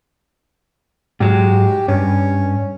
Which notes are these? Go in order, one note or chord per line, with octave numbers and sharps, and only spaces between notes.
G#2 F#3 G#3 G4
G2 C#4